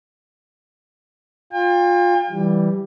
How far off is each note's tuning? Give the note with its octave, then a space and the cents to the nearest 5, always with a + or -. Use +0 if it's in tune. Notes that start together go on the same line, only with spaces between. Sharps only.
F4 +20 G5 +45
E3 +0 G3 +0